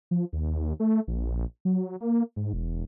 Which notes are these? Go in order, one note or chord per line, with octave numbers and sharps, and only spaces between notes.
F3
D#2
D#2
A3
A#1
F#3
A#3
G#2
E1